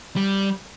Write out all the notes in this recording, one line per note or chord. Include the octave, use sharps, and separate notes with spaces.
G3